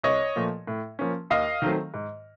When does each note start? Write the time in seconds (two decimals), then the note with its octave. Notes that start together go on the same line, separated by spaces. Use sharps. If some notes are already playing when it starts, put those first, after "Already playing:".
0.03 C2 C#5 D#5
0.36 A#2 F3 A3
0.67 A2
0.99 F3 A#3 C#4
1.30 D#2 D#5 F5
1.62 D#3 F#3 A3 C4
1.94 G#2